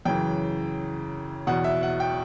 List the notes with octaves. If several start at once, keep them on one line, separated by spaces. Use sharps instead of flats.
F#2 C#3 E3 G5
E2 B2 F#3 F#5
E5
F#5
G5